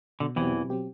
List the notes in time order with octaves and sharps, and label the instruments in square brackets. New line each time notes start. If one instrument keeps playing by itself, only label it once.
[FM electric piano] B2 [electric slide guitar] D3
[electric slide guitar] E2 E3 [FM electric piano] F#3 C4 G4
[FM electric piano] B2
F#3 C4 G4